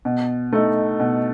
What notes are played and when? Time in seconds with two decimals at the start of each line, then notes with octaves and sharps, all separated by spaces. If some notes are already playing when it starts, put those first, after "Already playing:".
0.05 B2
0.53 A3 D#4
1.00 B2